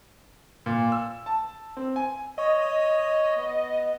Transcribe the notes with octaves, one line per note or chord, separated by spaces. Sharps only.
A#2
E6
A5
C4
G#5
C#5 D#5
B3